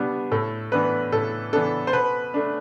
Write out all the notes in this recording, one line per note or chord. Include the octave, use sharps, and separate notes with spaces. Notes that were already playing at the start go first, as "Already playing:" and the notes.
Already playing: B2 G3 B3 D4
A2 A4
E3 B3 D4 B4
A2 A4
E3 B3 D4 A4
C5
B2 B4
A3 D4